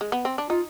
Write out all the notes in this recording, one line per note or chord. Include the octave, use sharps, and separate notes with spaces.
G#3
B3
C4
D4
D#4 F4